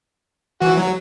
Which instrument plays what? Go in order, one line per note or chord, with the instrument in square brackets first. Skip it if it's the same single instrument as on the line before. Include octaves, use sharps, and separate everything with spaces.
[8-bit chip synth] E3 [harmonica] F#4
[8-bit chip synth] F#3